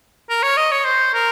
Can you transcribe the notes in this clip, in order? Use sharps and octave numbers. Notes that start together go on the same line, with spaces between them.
A#4
C#5
D#5
C#5
C5
A#4